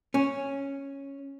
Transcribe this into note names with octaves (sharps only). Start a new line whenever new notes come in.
C#4